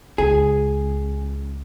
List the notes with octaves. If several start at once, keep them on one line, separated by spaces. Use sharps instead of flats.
C#2 G#4